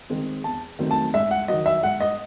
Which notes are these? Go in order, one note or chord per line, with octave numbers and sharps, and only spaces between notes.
D#3 G#3 C4
E2 A5
D#3 F#3 A3 C4
A5
G#2 E5
F#5
D#3 F#3 D#5
E5
G#2 F#5
D#5